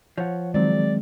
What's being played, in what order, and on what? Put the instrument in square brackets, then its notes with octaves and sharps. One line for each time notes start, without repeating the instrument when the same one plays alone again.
[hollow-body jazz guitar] F3 [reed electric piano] C#5 F#5
[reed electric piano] D#3 F#3 C4 [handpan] G#3 [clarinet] D5